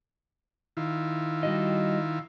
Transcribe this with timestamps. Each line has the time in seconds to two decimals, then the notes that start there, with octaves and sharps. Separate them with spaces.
0.77 D#3 E4 F4
1.43 G3 F#4 D#5